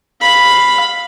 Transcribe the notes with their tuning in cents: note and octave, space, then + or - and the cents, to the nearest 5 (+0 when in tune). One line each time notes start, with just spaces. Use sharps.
F5 +0 B5 +0